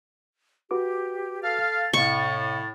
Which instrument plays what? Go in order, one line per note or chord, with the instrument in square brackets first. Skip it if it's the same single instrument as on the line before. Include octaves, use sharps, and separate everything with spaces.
[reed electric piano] F#4 B4 D6 [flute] G4
[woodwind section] A4 F5 [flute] A6
[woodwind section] A2 [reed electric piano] C3 D#5 F5 [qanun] C#6